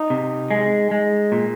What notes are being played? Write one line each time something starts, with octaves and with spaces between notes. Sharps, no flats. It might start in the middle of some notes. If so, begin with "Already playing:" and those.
Already playing: D#4
C3
G#3
G#3
A#2